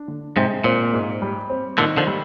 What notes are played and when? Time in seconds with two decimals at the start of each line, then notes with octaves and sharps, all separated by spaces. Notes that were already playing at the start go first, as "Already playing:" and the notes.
Already playing: D4
0.08 D3
0.36 G#2 C3 G#3
0.64 A#2 C4
0.94 G#2
1.22 G3
1.50 C4
1.78 A#2 D3 D#3
1.97 D3 F3
2.07 G3